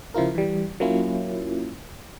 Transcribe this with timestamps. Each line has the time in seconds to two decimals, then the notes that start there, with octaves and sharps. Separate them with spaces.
0.14 C#3 F3 E4 F4 A#4
0.35 E3 G3
0.80 F#3 A#3 C#4 E4 F4